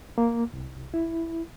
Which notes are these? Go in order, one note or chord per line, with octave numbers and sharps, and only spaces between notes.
A#3
C2
E4